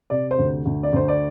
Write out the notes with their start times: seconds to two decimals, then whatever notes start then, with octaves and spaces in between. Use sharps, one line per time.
0.10 C3 D5
0.31 C5
0.38 D2
0.65 D2
0.83 D5
0.92 D2 C5
1.08 D5